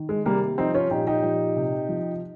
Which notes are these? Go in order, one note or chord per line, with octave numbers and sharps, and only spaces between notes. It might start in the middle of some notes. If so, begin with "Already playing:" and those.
Already playing: D#3
G#3
C3 G3 A#3
F3 C4 D#4
C#4 F4
A#2 D#4 G4
D#4 G4
F3
C3
F3